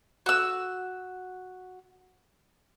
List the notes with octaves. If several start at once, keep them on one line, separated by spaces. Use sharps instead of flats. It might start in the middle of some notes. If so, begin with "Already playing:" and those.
F#4 E6